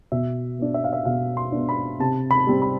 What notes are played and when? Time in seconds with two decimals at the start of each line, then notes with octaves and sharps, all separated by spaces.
0.12 B2 E5
0.59 B3 D4
0.74 E5
0.84 F5
0.93 E5
1.05 B2 F5
1.37 C6
1.52 B3 D4
1.69 B5
2.00 C3 A5
2.31 B5
2.47 G3 C4
2.62 B5